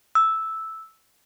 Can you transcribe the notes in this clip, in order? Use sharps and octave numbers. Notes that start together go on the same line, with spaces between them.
E6